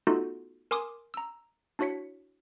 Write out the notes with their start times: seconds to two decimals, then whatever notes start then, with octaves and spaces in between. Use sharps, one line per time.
0.07 A3 B3 D#4 F4 F#4 A4
0.71 A#4 G#5 C6 D6 D#6
1.14 A#5 E6
1.79 D4 E4 F#4 C#5 B6 C#7